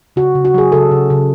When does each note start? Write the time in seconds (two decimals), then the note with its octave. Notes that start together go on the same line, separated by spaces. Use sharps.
0.16 C#3 F#4
0.35 C#3
0.45 F#4
0.54 F#3 G#4
0.72 C#3 A4
0.91 C#3
1.10 C#3